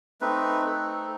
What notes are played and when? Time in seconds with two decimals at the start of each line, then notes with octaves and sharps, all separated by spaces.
0.21 A3 C4 D#4 B4
0.66 A4